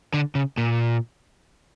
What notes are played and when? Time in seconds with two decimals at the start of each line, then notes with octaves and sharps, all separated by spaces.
0.14 D3
0.35 C#3
0.58 A#2